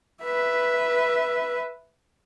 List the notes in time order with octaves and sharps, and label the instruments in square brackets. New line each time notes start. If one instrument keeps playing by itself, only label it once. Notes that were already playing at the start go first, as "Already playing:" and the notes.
[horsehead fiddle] B4 E5